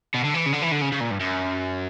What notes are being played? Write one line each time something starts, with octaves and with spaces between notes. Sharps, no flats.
B2
D3
E3
C#3
D3
E3
D3
C#3
C#3
A#2
G2
F#2